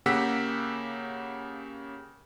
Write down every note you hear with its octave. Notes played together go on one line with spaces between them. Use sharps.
C#3 A#3 G4 F#5 E6 B6